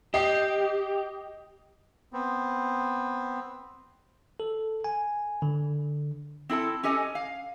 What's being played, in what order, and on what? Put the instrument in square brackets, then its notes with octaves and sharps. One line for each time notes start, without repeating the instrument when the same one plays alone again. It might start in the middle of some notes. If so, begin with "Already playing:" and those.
[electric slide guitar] G4 [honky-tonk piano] D#5 C7
[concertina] B3 C4
[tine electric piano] A4
G#5
D3
[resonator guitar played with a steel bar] C4 E4 A4 A5
C#4 G4 A4 D#5 G#5
F5